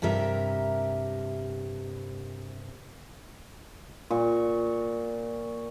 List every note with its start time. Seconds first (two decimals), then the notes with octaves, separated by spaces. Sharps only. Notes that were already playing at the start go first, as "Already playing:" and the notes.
0.02 G2 C3 G4 A#4 E5
4.10 A#2 C#6